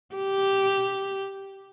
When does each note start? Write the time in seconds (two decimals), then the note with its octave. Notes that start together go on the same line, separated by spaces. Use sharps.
0.15 G4